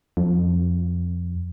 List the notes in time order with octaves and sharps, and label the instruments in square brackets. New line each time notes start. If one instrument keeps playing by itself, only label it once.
[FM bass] F2